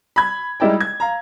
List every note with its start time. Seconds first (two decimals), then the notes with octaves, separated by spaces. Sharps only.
0.16 B5 G#6
0.60 G3 G#3 D#4 E4 D5 G5
0.80 G#6
1.00 F5 A#5